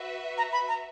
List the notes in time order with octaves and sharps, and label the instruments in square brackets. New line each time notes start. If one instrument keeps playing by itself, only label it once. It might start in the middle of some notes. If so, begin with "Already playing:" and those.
Already playing: [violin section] F#4 B4 E5
[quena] A#5
B5
A#5